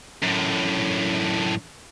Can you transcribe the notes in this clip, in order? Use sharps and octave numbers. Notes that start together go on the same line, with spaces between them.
F#2 A2